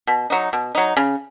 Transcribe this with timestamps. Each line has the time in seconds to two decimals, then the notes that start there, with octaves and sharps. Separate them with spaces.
0.07 B2
0.30 F#3 D#4
0.53 B2
0.75 F#3 D#4
0.97 C#3